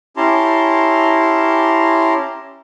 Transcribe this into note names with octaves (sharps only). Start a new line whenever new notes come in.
C#4 E4 G4 A5 A#5 C6